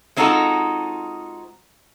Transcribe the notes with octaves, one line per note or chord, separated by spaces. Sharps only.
G#3 C4 D#4 F4 F#4 A4